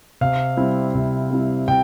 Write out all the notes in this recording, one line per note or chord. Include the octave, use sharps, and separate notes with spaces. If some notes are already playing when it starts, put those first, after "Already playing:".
C3 F5
G3 C4 E4
C3
G3 C4 E4
C3 G5